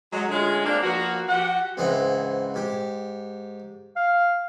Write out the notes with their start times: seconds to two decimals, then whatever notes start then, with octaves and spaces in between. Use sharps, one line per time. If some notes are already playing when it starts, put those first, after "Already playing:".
0.12 F#3 G#3
0.29 D3 G#3 A3 C#4 F4 G#4
0.65 G#3 A#3 C4 D4
0.83 F3 A#3 B3 F#4
1.28 F3 F#4 G4 F#5
1.77 C#2 G#2 E3 C4 D#5 F#5
2.54 G#2 G4
3.96 F5